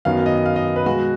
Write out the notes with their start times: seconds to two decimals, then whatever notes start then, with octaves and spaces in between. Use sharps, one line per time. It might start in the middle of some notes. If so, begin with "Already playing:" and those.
0.05 F#2 D#3 F#3 B3 F5
0.26 D#5
0.46 F5
0.56 D#5
0.76 B4
0.86 B2 G#3 B3 F#4